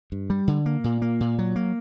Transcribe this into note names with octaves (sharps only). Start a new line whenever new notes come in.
G2
G3
D3
A#3
A#2
A#3
A#2
F#3
A#3